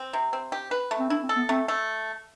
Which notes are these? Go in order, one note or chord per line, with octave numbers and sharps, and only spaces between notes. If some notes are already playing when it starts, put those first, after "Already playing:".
Already playing: C4
C3
C4
G4
B4
A3
C4
D4 E4
C4
A4
B3
A3 C4
A3